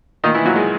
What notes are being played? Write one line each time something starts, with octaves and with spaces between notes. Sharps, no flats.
A#2 D#3 D#4
E3 E4
A#2 F#3 F#4
G#3 G#4